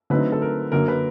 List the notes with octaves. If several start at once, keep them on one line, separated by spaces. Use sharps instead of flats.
D3 F#3 A3 C4 D#4 B4
A4
A#4
F#2 D3 F#3 A#3 A#4
B4